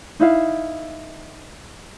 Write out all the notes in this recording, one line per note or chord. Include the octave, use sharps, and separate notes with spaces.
D#4 E4 F5